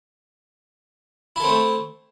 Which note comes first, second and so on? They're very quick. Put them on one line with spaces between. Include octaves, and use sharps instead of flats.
E4 A4 C4 A3